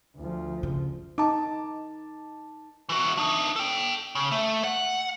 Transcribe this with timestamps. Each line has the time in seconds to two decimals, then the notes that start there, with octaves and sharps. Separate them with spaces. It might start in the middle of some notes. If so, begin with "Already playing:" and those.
0.17 D2 F3
0.63 C#3
1.18 D#4 A5 D6
2.89 E3 F#4
3.18 D4 D#4
3.56 A4 G5
4.15 C#3
4.31 A3
4.64 F#5